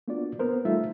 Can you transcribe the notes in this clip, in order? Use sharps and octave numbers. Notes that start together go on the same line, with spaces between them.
A#3 B3 D4 F4 F#4 D5
B3 C4 A#4 C5
G3 A3 D#4 F4 A4 E5